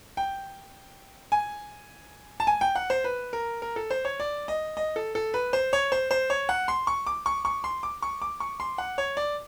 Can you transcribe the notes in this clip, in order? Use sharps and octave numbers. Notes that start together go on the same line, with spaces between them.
G5
G#5
A5
G#5
G5
F#5
C5
B4
A#4
A#4
A4
C5
C#5
D5
D#5
D#5
A4
A4
B4
C5
C#5
C5
C5
C#5
F#5
C6
C#6
D6
C#6
C#6
C6
D6
C#6
D6
C#6
C6
F#5
C#5
D5